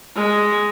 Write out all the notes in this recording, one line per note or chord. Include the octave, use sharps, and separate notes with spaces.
G#3